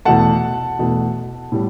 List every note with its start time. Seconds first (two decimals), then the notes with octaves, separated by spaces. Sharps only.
0.05 E2 B2 A3 F#5 A5
0.79 E2 B2 A3
1.52 A2 G3